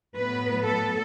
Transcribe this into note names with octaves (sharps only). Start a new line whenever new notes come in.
A2 F#3 B3 B4
A4